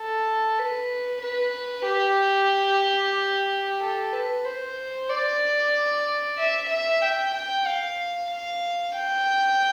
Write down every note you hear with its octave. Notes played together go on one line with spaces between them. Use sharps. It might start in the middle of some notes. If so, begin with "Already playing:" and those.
Already playing: A4
B4
B4
G4
A4
B4
C5
D5
E5
E5
G5
G5
F5
F5
G5